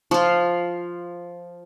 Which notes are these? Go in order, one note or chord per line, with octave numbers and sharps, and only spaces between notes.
F3 F4